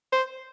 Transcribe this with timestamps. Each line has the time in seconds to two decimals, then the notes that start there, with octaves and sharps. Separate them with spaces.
0.13 C5